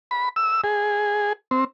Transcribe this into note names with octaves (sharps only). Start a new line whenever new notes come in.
B5
E6
G#4
C4